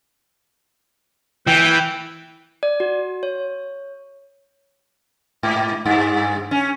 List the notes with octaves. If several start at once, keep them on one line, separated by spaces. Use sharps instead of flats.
E3 G5
D5
F#4
C#5
G#2
G2
C#4